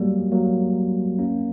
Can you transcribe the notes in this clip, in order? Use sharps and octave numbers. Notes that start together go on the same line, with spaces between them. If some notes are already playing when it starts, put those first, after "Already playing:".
Already playing: F#3 G3 A#3
F#3 A#3
A#3 C#4